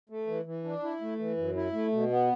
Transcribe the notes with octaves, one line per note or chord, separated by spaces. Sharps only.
A3
E3
E3
D4
E4
A3
E3
F#2
E4
A3
B2
B3